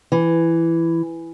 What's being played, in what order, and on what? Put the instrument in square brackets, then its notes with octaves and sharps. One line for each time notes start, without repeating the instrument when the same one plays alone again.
[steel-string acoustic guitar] E3